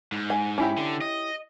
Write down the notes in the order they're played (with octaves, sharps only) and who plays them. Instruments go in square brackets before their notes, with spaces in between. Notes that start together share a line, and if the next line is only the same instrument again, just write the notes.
[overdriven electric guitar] G#2
[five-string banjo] G#5
C#4 E4 G4
[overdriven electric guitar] D3
D#5